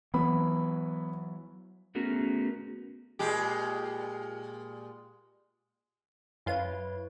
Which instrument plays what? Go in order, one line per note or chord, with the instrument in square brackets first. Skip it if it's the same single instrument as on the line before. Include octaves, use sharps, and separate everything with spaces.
[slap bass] E3 F#3 [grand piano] B3 B5
[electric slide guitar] A3 B3 C#4 F#4 G#4 A#4
[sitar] A#2 G#3 G4
[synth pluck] F#2 F4 D#7 [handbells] E4 B4 C#5